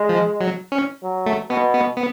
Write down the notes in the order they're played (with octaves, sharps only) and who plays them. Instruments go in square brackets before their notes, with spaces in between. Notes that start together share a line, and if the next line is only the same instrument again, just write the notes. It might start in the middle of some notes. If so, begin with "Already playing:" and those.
Already playing: [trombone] G#3
[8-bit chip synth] F3
F#3
C#4
[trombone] F#3
[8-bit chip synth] A3
[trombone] B2 [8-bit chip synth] B3
[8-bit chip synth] B3
B3